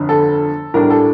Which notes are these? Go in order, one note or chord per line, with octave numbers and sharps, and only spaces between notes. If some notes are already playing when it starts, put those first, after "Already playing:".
Already playing: G1 F2 D3
A4
A2 G3 D4 A#4
A4